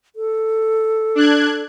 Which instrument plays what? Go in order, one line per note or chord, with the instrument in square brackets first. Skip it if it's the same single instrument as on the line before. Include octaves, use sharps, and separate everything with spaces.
[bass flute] A4
[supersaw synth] D4 F#6 G#6